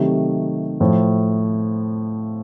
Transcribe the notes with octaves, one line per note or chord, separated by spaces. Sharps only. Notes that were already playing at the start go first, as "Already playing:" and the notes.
Already playing: C3 D#3 F#3 A3
A2 F3 A3